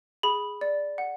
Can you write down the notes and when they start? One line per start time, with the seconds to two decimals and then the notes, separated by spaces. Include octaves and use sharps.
0.23 G#4 B5
0.61 D5
0.98 F#5